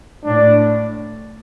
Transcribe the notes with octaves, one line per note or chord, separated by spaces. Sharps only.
A2 D4